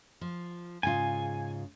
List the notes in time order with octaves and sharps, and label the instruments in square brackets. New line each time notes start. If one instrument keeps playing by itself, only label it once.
[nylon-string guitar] F3
[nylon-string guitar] G#2 C#3 F4 [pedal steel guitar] G#5